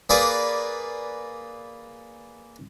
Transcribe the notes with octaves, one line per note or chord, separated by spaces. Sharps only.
A#3 G#4 B4 D5